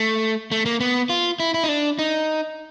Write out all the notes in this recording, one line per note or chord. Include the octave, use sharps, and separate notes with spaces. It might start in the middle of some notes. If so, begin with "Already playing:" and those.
Already playing: A3
A3
A#3
B3
F4
E4
E4
D#4
D4
D#4